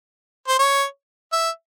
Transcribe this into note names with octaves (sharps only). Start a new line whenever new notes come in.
C5
C#5
E5